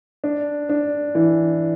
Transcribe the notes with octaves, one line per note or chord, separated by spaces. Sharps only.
D4
D4
E3